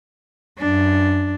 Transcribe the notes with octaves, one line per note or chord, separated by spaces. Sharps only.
F#2 D4